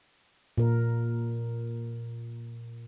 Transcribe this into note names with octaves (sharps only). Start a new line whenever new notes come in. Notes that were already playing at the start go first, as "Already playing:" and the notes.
A#2 A#4